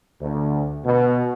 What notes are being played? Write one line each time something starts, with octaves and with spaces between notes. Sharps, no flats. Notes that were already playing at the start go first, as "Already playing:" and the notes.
D2
B2